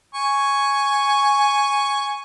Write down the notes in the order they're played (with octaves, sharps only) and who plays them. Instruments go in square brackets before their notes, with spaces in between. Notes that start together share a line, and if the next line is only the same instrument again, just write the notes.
[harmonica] G#5 C#6